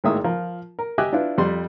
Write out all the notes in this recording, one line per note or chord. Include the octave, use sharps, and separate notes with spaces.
G#1 A2 G#3 A#3 E5 D#6
F3 F4 A#4
A#4
G4 D#5 E5 G#5 D6 F#6
D4 E4 F4 B4
F2 G3 C6